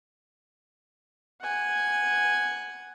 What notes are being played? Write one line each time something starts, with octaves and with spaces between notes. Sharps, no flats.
F#5 G#5